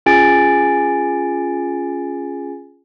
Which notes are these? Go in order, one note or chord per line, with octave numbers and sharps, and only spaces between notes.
C#4 F4 G#4 G#5 A6 D7